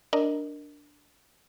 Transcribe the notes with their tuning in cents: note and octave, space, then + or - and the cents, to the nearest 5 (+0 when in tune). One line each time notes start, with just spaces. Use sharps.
D4 +0 A#4 +0 D#5 +0